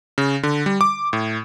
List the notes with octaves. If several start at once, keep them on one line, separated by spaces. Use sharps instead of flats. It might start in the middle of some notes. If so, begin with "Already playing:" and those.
C#3
D3
G3
D6
A2